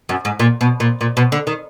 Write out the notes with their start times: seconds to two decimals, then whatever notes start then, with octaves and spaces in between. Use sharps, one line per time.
0.09 F#2
0.25 G#2
0.40 A#2
0.61 B2
0.80 A#2
1.01 A#2
1.17 B2
1.32 D3
1.47 D#3